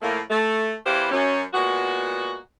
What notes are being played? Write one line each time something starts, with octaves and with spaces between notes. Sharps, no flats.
A2 F3 A3 A#3
A3
E2 E4 G4 B4 C5 F5
F#2 C#4
A#2 G#3 B3 F#4